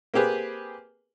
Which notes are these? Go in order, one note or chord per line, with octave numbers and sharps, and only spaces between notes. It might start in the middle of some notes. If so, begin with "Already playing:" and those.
A#3 C4 G4 G#4 B4